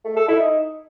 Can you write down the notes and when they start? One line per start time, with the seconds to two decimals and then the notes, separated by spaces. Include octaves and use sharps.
0.05 A3
0.16 A4
0.28 E4
0.40 D#4